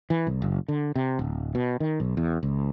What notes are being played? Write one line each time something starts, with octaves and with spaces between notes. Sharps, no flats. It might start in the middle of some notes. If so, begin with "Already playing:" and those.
E3
C2
F#1
D3
C3
D1
B2
D#3
B1
E2
C#2